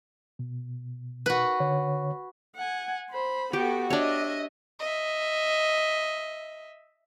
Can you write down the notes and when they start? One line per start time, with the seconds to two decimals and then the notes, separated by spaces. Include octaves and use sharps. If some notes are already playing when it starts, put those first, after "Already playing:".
0.39 B2
1.26 F#4 B4
1.60 D3 C#5
2.56 F#5 G#5
3.10 C5 B5
3.53 B3 F#4 G4 A4 G5
3.90 D4 C#5 D#5 E5
4.80 D#5 E5